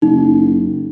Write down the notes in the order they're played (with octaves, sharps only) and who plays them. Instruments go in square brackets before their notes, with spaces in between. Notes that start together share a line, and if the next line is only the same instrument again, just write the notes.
[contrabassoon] F#1 [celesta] D#4